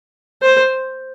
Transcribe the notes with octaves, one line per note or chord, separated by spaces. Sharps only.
C5